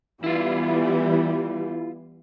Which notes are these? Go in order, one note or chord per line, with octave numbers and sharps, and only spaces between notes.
E3 G3 B3 E4 F4